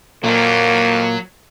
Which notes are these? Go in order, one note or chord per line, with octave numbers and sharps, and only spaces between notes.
F2 A#2 F#3 A#3